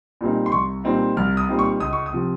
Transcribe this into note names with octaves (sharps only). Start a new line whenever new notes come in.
A#2 G3 C4 D#4
C6
C2 C#6
A#2 G3 C4 D#4
C2 F6
D#6
A#2 G3 C4 D#4
C#6
C#2 D#6
C#6
D#6
C3 F3